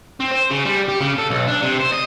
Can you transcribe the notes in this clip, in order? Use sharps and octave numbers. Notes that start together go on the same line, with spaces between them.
C4
C5
C#3
G3
G4
C#3
A4
B1
D4
C3
C5
D#5